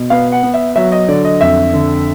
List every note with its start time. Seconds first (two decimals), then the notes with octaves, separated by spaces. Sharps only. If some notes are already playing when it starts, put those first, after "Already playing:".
Already playing: B2
0.10 B3 F5
0.32 F#5
0.43 B3
0.54 E5
0.76 F#3 E5
0.92 D#5
1.08 D3 D5
1.25 D#5
1.41 F2 E5
1.73 D3